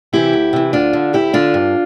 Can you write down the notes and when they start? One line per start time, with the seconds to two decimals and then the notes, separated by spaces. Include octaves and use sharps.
0.13 C3 E3 E4 G4
0.33 D2
0.53 C3 E3
0.73 D2 D4 F4
0.93 D3
1.13 D2 E4 G4
1.33 D3 D4 F4
1.54 G2